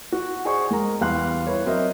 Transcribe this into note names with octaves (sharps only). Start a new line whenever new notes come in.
F#4
G#4 C5 D5 F#5 G#5 C#6
G#3 A#4 A#5
E2 G3 F5 C6 F#6
E4 B4 C#5
F#3 C4 A#4 C5 D#5 E5